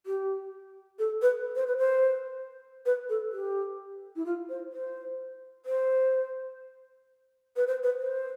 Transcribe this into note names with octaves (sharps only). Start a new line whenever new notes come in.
G4
A4
B4
C5
B4
C5
B4
A4
G4
E4
F4
C5
C5
C5
B4
C5
B4
C5